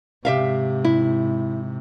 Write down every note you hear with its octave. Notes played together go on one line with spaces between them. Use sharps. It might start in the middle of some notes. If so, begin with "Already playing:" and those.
G#2 C3 G4 E5 F5
E4